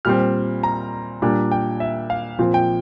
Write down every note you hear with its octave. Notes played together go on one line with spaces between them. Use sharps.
A#2 G3 C4 F6
A#5
A#2 G3 D4
G5
E5
F5
A#2 F3 C4
G5